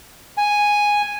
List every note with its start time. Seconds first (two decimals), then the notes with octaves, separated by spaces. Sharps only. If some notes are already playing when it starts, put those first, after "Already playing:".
0.38 G#5